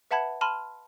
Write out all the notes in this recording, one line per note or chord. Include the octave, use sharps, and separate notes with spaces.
B4 E5 F#5 A5 B5 G#6
A5 B5 C6 F6 D#7